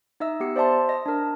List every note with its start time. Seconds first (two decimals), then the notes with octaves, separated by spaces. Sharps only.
0.20 D#4 D#5 E5 E6
0.40 B3 G4 C#7
0.56 C5 D5 E5 A5 C6
0.89 D#5 A#6
1.06 D4 A#4